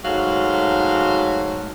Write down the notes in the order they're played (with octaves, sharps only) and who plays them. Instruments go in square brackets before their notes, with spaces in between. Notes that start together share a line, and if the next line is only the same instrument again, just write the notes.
[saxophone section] G#2 F#3 A3 F5